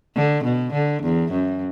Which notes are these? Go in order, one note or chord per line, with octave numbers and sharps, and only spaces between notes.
D3
B2
D3
E2
F#2